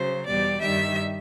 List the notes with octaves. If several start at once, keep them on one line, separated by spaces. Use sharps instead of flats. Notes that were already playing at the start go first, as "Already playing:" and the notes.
Already playing: C#3 F#3 C5
E2 B2 G3 D5
G2 D#3 G3 E5